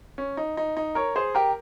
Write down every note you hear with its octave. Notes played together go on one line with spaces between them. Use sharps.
C#4
D#4
D#4
D#4
A#4 C#5
G#4 C5
G4 A#4